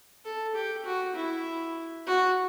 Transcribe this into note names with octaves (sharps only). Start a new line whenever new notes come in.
A4
G4
F#4
E4
F#4